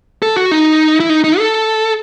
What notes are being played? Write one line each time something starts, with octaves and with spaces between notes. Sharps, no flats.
A4
F#4
D#4
E4
D#4
D#4
A4